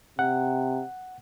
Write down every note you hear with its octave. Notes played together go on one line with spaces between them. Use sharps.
C3 F#5